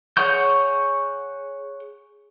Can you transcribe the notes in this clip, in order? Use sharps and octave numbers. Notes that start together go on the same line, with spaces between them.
G#4 C#5 F#5 C#6 G6